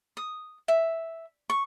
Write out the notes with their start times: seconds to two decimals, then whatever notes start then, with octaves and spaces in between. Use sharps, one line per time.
0.17 D#6
0.68 E5
1.50 C#6